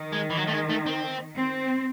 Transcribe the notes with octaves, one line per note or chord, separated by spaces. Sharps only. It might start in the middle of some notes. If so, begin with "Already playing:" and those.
Already playing: D#3
G#3
E3
F#3
A3
G#3
A3
C4
C4